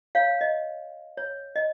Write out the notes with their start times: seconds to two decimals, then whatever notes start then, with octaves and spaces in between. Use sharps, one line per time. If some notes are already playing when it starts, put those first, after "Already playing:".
0.15 C#5 F5
0.41 D#5
1.17 C#5
1.56 D#5